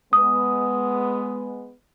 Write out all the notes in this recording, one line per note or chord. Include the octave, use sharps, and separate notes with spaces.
G#3 B3 D#6